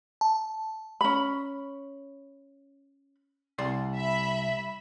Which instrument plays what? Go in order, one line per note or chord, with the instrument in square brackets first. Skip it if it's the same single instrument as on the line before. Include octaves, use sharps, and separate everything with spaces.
[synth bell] A5
[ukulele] C#4 B5
[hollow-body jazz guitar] C2 D5 C6
[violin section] E5 B5